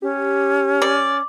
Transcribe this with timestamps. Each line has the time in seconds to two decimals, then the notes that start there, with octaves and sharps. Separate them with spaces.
0.02 C#4 G4
0.82 D5